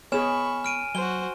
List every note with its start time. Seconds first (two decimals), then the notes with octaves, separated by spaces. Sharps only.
0.12 B3 G#4 C#5 G#5 B5 C#6 F6 E7
0.64 F6 D7 D#7
0.95 F#3 F#4 C5 G7